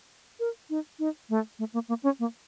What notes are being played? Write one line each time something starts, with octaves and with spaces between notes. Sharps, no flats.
A#4
D#4
D#4
A3
A3
A#3
A#3
C#4
A#3